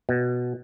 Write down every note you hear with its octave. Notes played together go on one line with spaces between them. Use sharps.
B2